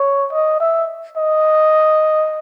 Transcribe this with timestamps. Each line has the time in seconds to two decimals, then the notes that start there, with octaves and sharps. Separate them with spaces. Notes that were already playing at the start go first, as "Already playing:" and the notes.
Already playing: C#5
0.32 D#5
0.60 E5
1.17 D#5